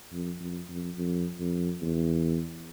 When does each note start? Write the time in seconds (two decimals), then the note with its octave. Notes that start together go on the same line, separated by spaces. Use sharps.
0.12 F2
0.40 F2
0.69 F2
0.96 F2
1.40 F2
1.82 E2